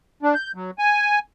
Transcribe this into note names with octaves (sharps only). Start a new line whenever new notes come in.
D4
G6
F#3
G#5